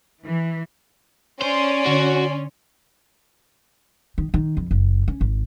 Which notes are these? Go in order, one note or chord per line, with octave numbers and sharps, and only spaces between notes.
E3
C#4 C5 D5 C6
D3 F#4 D7
D#3
D#3
F2
F#1
C#4
G#1